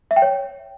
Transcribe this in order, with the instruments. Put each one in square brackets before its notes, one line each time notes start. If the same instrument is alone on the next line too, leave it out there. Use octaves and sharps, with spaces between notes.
[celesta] E5
G5
C#5